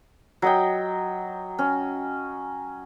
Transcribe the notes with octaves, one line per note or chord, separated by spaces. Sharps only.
F#3 D#5 G5
C#4